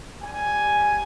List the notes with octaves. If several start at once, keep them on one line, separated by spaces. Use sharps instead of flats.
G3 G#5